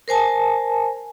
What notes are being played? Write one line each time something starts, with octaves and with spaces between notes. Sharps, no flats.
A#4 C5 G#5 A5